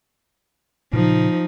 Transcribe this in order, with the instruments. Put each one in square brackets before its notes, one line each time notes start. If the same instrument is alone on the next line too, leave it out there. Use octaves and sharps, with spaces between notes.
[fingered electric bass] A#2 C#3 [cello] F3 D#4